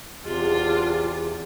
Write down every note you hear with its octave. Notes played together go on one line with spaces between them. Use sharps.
E2 C3 G#3 D4 F4